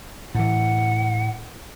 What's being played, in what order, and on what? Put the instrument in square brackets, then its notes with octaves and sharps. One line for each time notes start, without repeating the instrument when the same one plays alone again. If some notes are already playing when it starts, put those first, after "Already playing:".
[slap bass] A2 E3 [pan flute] F#5